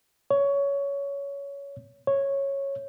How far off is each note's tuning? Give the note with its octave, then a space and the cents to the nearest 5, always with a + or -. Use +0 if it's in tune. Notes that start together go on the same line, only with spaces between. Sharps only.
C#5 +15
C#5 -10